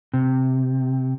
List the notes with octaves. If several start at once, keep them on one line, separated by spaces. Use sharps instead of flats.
C3